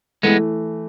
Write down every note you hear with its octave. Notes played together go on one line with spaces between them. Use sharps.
E3 G#3 A3 B3